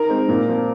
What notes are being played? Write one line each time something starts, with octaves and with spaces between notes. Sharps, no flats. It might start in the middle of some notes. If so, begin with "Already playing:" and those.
Already playing: D#3 A#4
G#3 C4
A#2
F3 C4